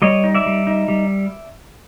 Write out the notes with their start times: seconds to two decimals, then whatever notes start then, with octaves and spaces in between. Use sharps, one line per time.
0.02 G3 C#5 D#5
0.24 D#4
0.34 D5 E5
0.46 G3
0.67 D#4
0.88 G3